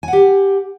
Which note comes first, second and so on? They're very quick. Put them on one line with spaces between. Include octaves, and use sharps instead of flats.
G#5 F#5 G4